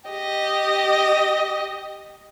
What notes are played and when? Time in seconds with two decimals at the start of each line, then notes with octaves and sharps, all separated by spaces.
0.10 G4 D#5